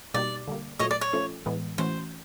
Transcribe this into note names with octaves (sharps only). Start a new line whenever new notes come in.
B2 G3 A#3 D#4 G4 D5
D3 G3 A#3
A#2 F#3 A3 C#5 D#5
D5
C#5
F3 A3 C#4 F4 A4
A2 E3 G#3 B3
E3 A3 C#4 F#4 C5